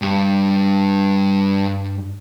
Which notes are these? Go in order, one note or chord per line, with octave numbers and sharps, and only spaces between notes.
G2 G3